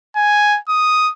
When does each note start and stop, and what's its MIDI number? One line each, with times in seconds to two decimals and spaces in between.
0.16 0.59 80
0.69 1.11 87